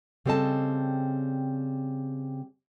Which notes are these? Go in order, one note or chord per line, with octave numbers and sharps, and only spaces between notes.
C#3 G3 C4 A4 D#5 A5